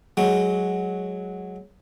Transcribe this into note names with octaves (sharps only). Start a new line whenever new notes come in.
F#3 G#3